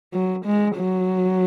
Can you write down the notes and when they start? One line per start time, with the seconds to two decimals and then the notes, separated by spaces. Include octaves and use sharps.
0.13 F#3
0.45 G#3
0.76 F#3